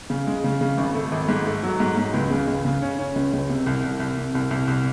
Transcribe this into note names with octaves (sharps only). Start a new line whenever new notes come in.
C#3
G#3
C#3
C#3
G#1
A3
G#1
G#2
A3
F#3
G#2
G#2
C#2
C#3
C#2
C#3
C#4
C#4
C#2
C#2
C3
C2
C2
C2
C3
C2
C2
C2